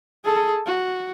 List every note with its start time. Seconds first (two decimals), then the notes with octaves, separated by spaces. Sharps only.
0.24 G#4 A4
0.66 F#4